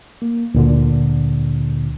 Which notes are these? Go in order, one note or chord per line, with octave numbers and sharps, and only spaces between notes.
A#3
D2 A#2 D3